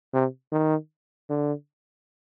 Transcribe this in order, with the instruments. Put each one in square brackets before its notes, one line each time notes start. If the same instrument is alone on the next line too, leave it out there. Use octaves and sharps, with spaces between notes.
[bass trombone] C3
D#3
D3